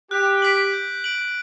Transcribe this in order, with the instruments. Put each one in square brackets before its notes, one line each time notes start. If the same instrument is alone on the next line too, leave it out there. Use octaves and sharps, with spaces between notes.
[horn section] G4 [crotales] F#6
[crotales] B6 D7 F#7
G6
D7 F#7